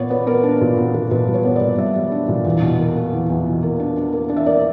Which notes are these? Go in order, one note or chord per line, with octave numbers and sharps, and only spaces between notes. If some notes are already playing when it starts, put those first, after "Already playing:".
Already playing: A#2 B3 C#5 D5
B3 B4
B3 A#4
D4
A#2
B3
A#2
A#2 B4
G3
C#5
B3
D5
A#2
G3 E5
G3
D4
A#2
E2
B2
A#3
A#3
E2
E2
B2
A#3
D4
D4
A#3
D4
E5
A#3 D5